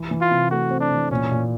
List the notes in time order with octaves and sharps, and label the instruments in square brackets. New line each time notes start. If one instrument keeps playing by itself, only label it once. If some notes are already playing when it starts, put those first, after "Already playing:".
Already playing: [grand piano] E3
E3
[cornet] F4
[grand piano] C3
[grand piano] A3 [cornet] F#4
[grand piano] C4
[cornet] D4
[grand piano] E3
[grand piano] A#2 [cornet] C#4
[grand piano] A#2